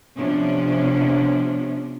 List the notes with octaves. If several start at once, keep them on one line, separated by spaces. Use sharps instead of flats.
C3 F3 B3 C#4 D4